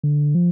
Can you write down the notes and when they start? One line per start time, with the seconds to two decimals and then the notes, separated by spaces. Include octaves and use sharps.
0.03 D3
0.35 F3